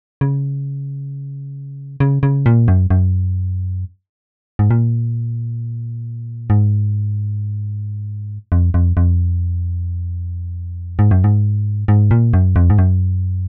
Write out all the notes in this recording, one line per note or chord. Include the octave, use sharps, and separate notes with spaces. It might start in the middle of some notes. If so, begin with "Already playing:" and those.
C#3
C#3
C#3
A#2
F#2
F#2
G#2
A#2
G#2
F2
F2
F2
G#2
F#2
G#2
G#2
A#2
F#2
F2
G#2
F#2